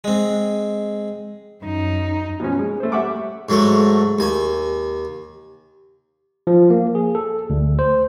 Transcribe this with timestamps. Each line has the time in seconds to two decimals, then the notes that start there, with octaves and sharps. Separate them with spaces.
0.04 G#3 C4
1.63 F#2 D#4
2.40 B2 F3 B3 C#4
2.59 G#3
2.80 A3 C5
2.92 G3 G4 E5 F#5 C#6 D6
3.49 G#2 F#3 A3
4.19 D#2 G#5
6.47 F3
6.70 A#3
6.95 G#4
7.15 A4
7.50 D2
7.79 C5